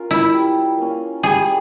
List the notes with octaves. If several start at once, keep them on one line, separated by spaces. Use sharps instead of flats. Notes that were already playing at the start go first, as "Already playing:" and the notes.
Already playing: C#4 F4 A#4
E4
G3
A#3 C#4
G3 G#4